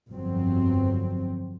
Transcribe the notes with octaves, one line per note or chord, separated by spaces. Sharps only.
G1 F2 F#3 C4